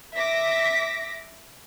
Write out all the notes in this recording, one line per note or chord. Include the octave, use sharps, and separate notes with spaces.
E5 D6 A#6 B6